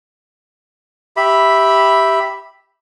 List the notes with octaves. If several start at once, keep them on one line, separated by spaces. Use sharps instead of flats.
G4 E5 B5